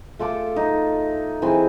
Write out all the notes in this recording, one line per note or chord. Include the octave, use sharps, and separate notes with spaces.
A3 F4 A4 D6
D#4
E3 C4 G#4